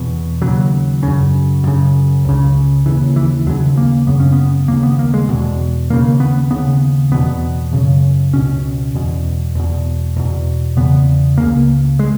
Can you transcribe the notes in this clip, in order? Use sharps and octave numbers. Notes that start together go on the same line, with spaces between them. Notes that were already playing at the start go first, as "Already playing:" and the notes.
Already playing: E2 B2
D#2 C#3 F#3
F#2 C#3
F#2 C#3
C#2 C#3
D#2 C#3 E3
E3
D#2 C#3 F#3
A#3
F#2 C#3 B3
C#4
B3
D#2 C#3 A#3
B3
A#3
G#3
E2 B2
D#2 C#3 A#3
B3
D#2 C#3 B3
E2 B2 B3
F#2 C#3
C#2 B2 C#4
E2 B2
E2 B2
E2 B2
E2 C#3 B3
C#2 C#3 A#3
G#3